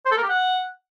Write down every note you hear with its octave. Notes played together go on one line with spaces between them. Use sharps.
C5
A4
A#4
G4
F#5